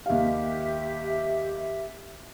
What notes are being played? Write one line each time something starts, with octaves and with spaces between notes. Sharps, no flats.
D#2 G4 E5 F5